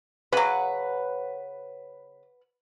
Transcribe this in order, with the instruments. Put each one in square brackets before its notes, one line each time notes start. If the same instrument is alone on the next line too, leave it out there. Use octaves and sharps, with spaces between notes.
[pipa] C#3 F#3 [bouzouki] B4 F#5